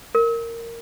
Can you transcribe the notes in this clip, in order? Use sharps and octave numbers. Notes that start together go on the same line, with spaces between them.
A#4